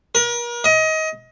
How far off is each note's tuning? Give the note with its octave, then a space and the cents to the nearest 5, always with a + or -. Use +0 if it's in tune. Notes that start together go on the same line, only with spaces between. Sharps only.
A#4 +40
D#5 +25